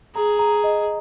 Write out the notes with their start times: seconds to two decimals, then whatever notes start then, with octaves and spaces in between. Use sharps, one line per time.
0.15 G#4 A#5
0.39 A#5
0.64 D#5